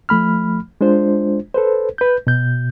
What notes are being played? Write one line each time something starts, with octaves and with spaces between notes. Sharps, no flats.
F3 A3 B5 F6
G#3 D4 F4 C5
A4 B4 C5
B4 G6
B2 G6